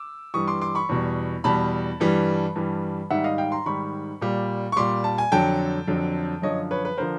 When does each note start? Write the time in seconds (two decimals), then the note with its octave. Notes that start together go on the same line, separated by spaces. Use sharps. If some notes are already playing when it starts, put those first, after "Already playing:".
Already playing: D6 E6
0.34 G2 E3 G3 C#6 D#6
0.48 C6 D6
0.61 C6 D6
0.75 B5 C#6
0.89 E2 B2 G3
1.44 E2 B2 G3 A5 B5
2.00 G2 E3 G3
2.55 G2 E3 G3
3.10 G#2 D#3 G3 E5 F#5
3.24 D#5 F5
3.38 F5 G5
3.52 A#5 C6
3.66 G#2 D#3 G3 B5 C#6
4.21 A#2 G3
4.72 C#6
4.76 A#2 G3 C6 D6
5.04 A5
5.18 G#5
5.32 F2 D3 F#3 G5 A5
5.87 F2 D3 F#3
6.42 F#2 D3 F3 C#5 D#5
6.71 B4 C#5
6.85 B4
6.98 D3 F3 A#4 C5